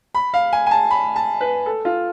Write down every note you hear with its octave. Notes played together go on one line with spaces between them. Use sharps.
B5
F5
G#5
G#5
A5
B5
A5
B4
A4
F4